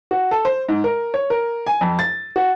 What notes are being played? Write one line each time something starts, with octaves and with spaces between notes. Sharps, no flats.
F#4
A4
C5
G#2
A#4
C#5
A#4
G#5
F2
A6
F#4